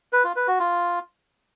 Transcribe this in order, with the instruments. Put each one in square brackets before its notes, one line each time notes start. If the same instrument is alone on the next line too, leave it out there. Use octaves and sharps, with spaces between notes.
[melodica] B4
F4
B4
F#4
F4